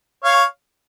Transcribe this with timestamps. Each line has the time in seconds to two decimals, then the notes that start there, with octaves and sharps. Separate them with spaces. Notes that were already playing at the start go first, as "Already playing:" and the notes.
0.24 C#5 F5